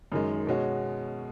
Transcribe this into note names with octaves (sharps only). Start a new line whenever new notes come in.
F#2 D#3 G#3
B2 G#3 C#4 F#4